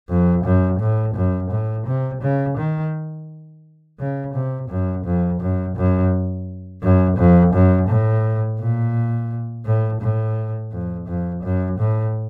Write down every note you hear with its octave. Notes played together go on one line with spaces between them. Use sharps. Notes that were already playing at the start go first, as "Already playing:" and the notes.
F2
F#2
A2
F#2
A2
C3
C#3
D#3
C#3
C3
F#2
F2
F#2
F#2
F#2
F2
F#2
A2
A#2
A2
A2
F2
F2
F#2
A2